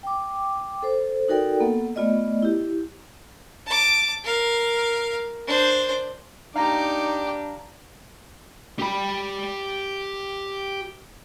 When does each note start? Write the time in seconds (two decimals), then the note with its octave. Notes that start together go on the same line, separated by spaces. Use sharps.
0.03 G5 D6
0.82 A4 C5
1.28 D#4 F#4 A4 A#4 D5 G5
1.60 A#3 B3 A4 F#5
1.96 A3 B3 F4 D5 D#5
2.42 E4 G4
3.67 A5 D6
4.24 A#4 F5
5.47 D4 C5
6.56 D4 D#4 G4 F5 A#5 D6
8.79 G4 B5